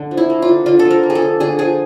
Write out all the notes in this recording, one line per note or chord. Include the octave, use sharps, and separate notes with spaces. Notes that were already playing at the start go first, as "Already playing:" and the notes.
Already playing: D3
F3
E4
A#3
F4
D3
D3 F4
A4
F3
A#4
A#3
G#4
A4
D3
D3 G#4
F3 G#4